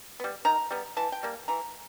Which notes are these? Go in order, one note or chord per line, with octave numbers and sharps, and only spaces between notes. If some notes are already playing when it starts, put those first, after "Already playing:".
G3 B3
D#3 A#5
G3 B3
E3 A5
G5
G3 A#3
E3 A#5